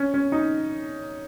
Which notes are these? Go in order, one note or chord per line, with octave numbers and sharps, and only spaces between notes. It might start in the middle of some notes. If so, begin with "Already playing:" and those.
Already playing: C#4
C#4
D#4